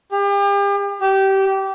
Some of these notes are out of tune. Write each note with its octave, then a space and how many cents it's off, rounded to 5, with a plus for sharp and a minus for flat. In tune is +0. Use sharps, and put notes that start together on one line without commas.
G4 +40
G4 -20